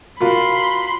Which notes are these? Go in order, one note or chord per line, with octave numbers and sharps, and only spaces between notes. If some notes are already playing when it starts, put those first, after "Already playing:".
F4 F#4 A#4 B5 C6